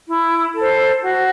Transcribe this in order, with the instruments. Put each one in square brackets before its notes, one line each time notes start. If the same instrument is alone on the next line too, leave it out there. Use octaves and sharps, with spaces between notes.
[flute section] E4
A4 C5
F#4